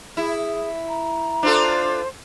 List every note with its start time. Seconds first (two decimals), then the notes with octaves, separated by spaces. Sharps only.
0.17 E4 G#4
0.89 A#5
1.43 D4 F4 A4 C5